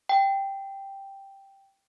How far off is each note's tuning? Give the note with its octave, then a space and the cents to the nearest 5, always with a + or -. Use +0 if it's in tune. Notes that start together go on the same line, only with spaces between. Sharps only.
G5 +0